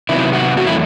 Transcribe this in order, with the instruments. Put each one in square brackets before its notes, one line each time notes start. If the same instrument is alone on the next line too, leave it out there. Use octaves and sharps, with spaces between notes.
[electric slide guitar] C3 D#3 F#3 B3 E4
F#4
E2 D#3 F#3 A3 F#4
E4